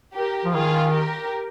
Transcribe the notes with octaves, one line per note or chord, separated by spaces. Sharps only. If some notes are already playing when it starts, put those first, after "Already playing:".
G4 A#4
F3
D#3 F4 G#4
G4 A#4